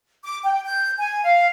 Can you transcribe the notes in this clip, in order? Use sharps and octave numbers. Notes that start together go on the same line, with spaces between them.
D6
G5
G6
G#5
F5